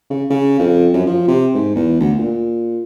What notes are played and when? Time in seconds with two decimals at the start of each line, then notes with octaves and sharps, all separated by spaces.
0.10 C#3
0.30 C#3
0.59 F2
0.94 F#2
1.07 F3
1.28 C3
1.54 G#2
1.76 E2
2.00 D2
2.19 A#2